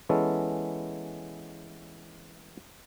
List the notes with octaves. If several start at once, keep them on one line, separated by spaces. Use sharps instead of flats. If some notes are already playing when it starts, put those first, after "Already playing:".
E3 G#3 B3 C#4 A4